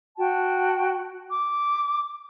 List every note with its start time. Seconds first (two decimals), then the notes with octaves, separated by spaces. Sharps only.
0.17 F#4 G5 A5
1.31 D6